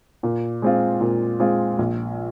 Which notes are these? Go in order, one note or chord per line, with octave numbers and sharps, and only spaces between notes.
A#2
G#3 C4 F4
A#2
G#3 C4 F4
A#1